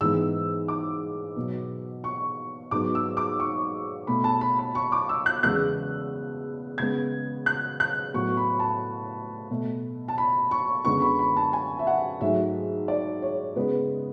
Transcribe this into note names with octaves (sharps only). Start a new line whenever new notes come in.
G#2 E3 G#3 B3 E6
D6
B2 F#3 B3
C#6
G#2 F#3 B3 D6
E6
D6
C#6
B2 A3 B5
A5
B5
B5
C#6
D6
E6
F#6
E2 C#3 G#3 B3 F#6
C#3 G#3 B3 G#6
F#6
F#6
A2 F#3 B3 C#6
B5
A5
B2 A3
A5
B5
C#6
F#2 D3 G#3 B3 C#6
B5
B5
A5
G#5
E5
F#5
G#2 F#3 A3 E5
D5
C#5
C#3 G#3 B3 B4